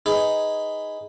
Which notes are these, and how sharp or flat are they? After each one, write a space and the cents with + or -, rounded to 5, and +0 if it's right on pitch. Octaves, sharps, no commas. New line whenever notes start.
D#4 +10 G#4 +0 B4 +15